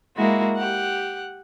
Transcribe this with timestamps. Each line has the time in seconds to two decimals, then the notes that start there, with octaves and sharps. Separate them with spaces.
0.17 G#3 A#3 E4 F#4 A#4
0.56 G4 F#5